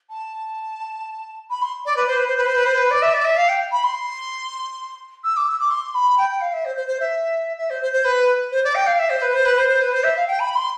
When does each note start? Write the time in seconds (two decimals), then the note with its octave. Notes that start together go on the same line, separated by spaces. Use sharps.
0.10 A5
1.50 B5
1.62 C6
1.85 D5
1.96 B4
2.07 C5
2.16 B4
2.27 C5
2.37 B4
2.46 C5
2.56 B4
2.66 C5
2.76 B4
2.90 D5
3.02 E5
3.13 D5
3.25 E5
3.37 F5
3.48 G5
3.71 B5
3.83 C6
5.24 E6
5.36 D6
5.48 E6
5.59 D6
5.70 C6
5.94 B5
6.17 G5
6.30 G5
6.40 F5
6.53 E5
6.65 C5
6.77 C5
6.87 C5
7.00 E5
7.58 E5
7.70 C5
7.82 C5
7.93 C5
8.04 B4
8.51 C5
8.64 D5
8.75 G5
8.86 F5
8.99 E5
9.10 C5
9.21 B4
9.33 C5
9.45 B4
9.58 C5
9.68 C5
9.81 B4
9.92 C5
10.03 E5
10.16 F5
10.27 G5
10.39 B5
10.55 C6